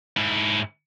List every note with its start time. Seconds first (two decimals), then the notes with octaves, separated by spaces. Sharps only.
0.17 G#2 E4